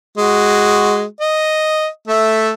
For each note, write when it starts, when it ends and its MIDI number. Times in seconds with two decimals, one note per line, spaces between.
0.18 1.03 56
0.18 1.03 66
1.21 1.87 75
2.08 2.51 57
2.08 2.51 76